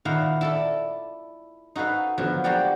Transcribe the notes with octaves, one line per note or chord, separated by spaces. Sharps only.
A#2 D#3 E4 F5 F#5 A#5
E4 A4 D5
D#4 F#4 A4 B4 F5
D3 F3 F#3 B3
A#3 F#4 G4 D5 F#5